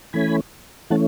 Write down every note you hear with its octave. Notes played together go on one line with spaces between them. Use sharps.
E3 A3 C#4 G#5 B5
E3 A3 C#4 F#5 A5